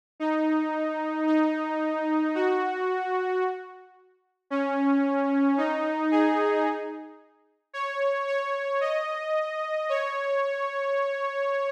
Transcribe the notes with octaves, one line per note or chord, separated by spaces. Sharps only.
D#4
D#4
F#4
C#4
D#4
G#4
C#5
C#5
D#5
C#5